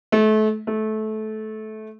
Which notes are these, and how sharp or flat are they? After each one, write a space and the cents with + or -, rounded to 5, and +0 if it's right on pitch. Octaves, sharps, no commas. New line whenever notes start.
A3 -30
A3 -20